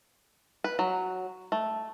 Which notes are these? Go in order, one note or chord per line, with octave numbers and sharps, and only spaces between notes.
B4
F#3
A3